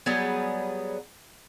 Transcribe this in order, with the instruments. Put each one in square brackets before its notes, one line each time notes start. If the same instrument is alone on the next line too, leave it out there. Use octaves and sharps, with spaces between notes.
[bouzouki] F#3 G3 B3 G#4